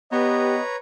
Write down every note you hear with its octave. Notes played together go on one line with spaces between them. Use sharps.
B3 G4 B4 C#5 D#5 A#5